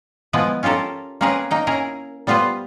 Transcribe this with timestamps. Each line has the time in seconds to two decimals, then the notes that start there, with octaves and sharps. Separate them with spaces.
0.33 F3 G#3 B3 E4 B4
0.63 C#4 F4 G4 A4 A#4
1.21 A#3 C4 C#4 G#4 A#4 B4
1.51 A#3 D#4 G5
1.67 C#4 E4 G#4 A#4
2.27 G3 B3 F4 B4 C5